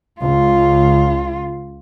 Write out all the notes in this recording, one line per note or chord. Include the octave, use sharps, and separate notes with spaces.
C#2 F4